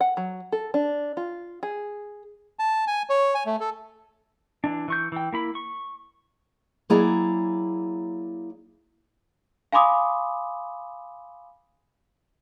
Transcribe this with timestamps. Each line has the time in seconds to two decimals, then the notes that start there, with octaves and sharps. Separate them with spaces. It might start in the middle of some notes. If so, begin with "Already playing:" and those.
0.01 F#5
0.17 F#3
0.52 A4
0.74 D4
1.17 F4
1.63 G#4
2.59 A5
2.87 G#5
3.10 C#5
3.35 G#5
3.46 A3
3.60 A4
4.64 E3 D4
4.88 E3 C#6 G6
5.12 E3 G5
5.33 A#3 E4 B5
5.55 C#6
6.90 F#3 A#3 E4 G#4 D5 A#5
9.72 F5 G#5 B5 C6 D6 D#6